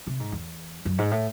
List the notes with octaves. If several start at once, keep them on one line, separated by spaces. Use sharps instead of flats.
C3
G#2
E2
F#2
G#2
A2